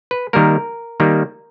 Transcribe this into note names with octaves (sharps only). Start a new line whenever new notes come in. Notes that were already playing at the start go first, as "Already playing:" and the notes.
B4
D#3 G3 A#3 A#4
D#3 G3 A#3